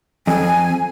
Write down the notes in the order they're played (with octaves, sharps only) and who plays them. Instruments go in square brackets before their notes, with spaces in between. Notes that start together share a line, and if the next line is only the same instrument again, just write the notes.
[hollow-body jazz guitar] F2 [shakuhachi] G#5